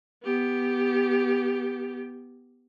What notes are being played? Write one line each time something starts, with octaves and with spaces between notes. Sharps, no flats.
B3 G4